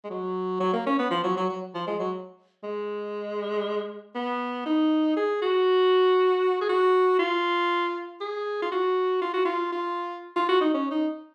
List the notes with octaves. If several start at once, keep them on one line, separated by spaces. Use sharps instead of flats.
G#3
F#3
F#3
A#3
C#4
B3
F3
F#3
F#3
F#3
F3
G#3
F#3
G#3
B3
D#4
G#4
F#4
G#4
F#4
F4
G#4
F4
F#4
F4
F#4
F4
F4
F4
F#4
D#4
C#4
D#4